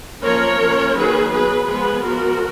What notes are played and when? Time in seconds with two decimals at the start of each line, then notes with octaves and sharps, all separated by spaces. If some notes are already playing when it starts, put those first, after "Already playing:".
0.24 F3 A#3 C#4 A#4 C#5
0.60 F3 A#3 C#4
0.95 D#3 F#3 A#3 G#4 B4
1.32 F#3 B3 G#4 B4
1.67 F3 G#3 B3 G#4 B4
2.03 F3 G#3 B3 F#4 A#4